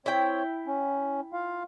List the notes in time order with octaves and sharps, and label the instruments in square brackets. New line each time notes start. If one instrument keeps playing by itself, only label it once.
[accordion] C4 C#5 [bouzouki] E4 G5
[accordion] C#4
F4 F5